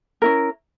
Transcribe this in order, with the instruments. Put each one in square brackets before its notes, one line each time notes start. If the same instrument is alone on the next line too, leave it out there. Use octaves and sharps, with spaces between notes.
[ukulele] C#4 E4 A#4